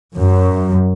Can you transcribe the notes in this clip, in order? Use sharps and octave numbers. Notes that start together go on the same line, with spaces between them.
F#2